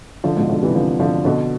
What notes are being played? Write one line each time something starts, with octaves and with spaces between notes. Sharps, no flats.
D3 F3
G#2 B2
B2 D3
C3 E3
D3 F3
D3 F3
B2 D3